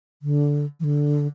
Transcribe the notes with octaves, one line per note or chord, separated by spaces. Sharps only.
D3
E3
D3